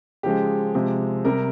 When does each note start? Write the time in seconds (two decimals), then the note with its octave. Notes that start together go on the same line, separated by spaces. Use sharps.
0.23 C#3 F3 G#3 G4
0.75 C3 F3 G#3
1.25 C3 G3 A#4